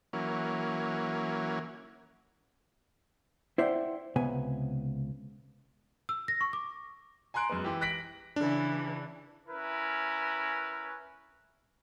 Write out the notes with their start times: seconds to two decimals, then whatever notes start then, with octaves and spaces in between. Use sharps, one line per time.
0.13 E3 F#3 A#3 C#4
3.58 E4 C5 D5 E5 F#5 G5
4.16 C#2 C3 B3 G#5
6.09 E6
6.28 A#6
6.41 C#6
6.53 D6
7.34 G#5 A#5 C6 F#6 D7
7.49 F#2 G#3 B3
7.64 E3 G4
7.81 F#6 A#6 B6 D7 F#7
8.36 C#3 E3 D4
9.48 C#4 E4 A#4 B4